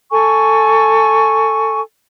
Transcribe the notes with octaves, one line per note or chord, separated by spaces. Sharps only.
A4 G#5 C#6